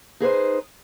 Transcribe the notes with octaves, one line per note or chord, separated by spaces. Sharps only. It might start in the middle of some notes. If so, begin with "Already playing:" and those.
D#4 G#4 B4 C5